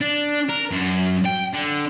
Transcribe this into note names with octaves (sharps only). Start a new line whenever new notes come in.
D4
A#4
F#2
G5
D3